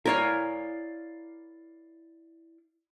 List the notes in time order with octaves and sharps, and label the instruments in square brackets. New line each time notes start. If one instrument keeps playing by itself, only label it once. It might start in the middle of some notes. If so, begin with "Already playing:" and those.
[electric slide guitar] E4 D5 F5 [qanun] A#4 C#5 G#5